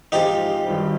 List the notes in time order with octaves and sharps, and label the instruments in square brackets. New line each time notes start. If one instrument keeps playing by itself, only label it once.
[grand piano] G#2 F3 C4 F4 G#4 [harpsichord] D#4 G4
[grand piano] G#1 G2 D#3 G3